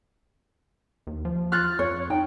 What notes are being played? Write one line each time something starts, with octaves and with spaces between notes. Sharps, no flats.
D#2
F3
F4 F6 F#6 A6
F2 C#5
D#4 G5